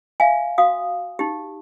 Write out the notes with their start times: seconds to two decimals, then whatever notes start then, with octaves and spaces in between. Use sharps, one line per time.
0.20 E5 F5 G#5
0.58 F#4 F5 D#6
1.19 D#4 G4